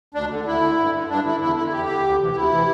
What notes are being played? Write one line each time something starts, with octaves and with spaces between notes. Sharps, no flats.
D2 D4
D3
D2 E4
D3
G2
D3
G2 D4
D3 E4
E2 E4
D3 E4
E4
E2 G4
D3
D2
C3 E3
G4
D2 E4
C3 E3